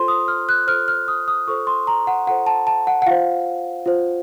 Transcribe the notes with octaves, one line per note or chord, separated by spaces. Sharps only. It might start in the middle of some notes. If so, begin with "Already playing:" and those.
Already playing: F4 A4 C5 C6
D#6
F6
F#6
F4 A4 C5 F6
F6
D#6
D#6
F4 A4 C5 C#6
C6
A#5
F#5
F4 A4 C5 F#5
A5
A5
F#5
F#5
F4 C5 F5
F4 C5